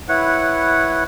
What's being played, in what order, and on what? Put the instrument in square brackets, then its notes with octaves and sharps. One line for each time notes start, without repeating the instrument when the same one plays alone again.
[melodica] E4 B4 C#5 F#5